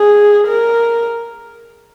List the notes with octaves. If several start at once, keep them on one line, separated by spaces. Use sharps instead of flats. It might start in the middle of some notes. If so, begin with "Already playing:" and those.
Already playing: G#4
A#4